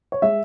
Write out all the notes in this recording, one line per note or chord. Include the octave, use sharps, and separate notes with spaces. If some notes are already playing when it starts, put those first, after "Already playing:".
C#5
G#3 E5